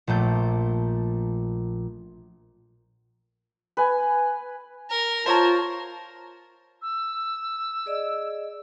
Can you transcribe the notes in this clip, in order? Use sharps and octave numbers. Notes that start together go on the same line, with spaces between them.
A#1 A#2 A3 G6
B4 G#5
A#4
F4 C5 C#5 A5 A#5
E6
G#4 D5 D#5